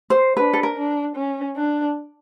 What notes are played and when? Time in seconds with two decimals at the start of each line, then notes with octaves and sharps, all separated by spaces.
0.10 C5
0.37 D4 B4
0.53 A4
0.63 A#4
0.77 D4
1.16 C#4
1.56 D4